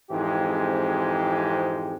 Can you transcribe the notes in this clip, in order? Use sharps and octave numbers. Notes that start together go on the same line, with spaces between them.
F2 G#2 E3 G#3 C4 G4